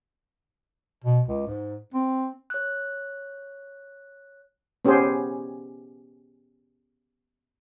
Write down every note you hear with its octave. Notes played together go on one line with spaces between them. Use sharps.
B2
C#2
G#2
C4
C#5 F#6
B3 C#4 G4 G#4 C5